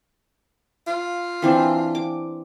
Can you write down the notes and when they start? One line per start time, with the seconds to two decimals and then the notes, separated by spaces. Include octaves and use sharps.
0.87 F4
1.42 E3 C4 D4
1.95 D6